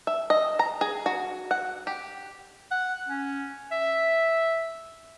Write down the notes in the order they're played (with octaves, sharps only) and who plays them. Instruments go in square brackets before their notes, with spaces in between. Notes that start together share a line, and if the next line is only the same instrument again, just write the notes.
[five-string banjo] E5
D#5
A#5
G#4
F#4
F#5
G4
[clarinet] F#5
C#4
E5